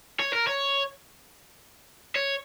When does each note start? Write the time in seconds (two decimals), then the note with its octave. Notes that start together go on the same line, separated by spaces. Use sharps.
0.20 C#5
0.33 A#4
0.47 C#5
2.16 C#5